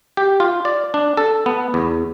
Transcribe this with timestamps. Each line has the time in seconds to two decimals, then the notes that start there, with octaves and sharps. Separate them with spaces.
0.17 G4
0.40 F4
0.65 D5
0.94 D4
1.17 A4
1.46 B3
1.74 E2